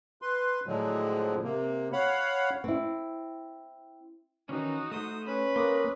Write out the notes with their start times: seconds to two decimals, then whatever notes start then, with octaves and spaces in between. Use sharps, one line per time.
0.22 B4 C6
0.67 A2 D3 F3 F#3 G#3
1.43 C3 A#3
1.93 C#5 F5 F#5 B5
2.64 C4 E4
4.49 D#3 E3 C#4 D#4 F#4
4.91 A3 C5 D#6
5.27 C#4 B4 B5
5.56 A#3 C6 D6 D#6